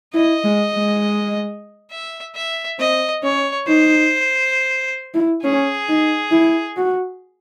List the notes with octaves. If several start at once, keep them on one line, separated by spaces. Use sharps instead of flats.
E4 D#5
G#3
G#3
E5
E5
C4 D#5
C#4 C#5
D#4 C5
E4
C#4 G#4
D#4
E4
F#4